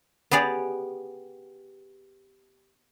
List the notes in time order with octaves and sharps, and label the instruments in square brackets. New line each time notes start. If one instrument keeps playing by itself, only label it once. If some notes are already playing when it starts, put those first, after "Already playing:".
[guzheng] B3 G4 G#4 D5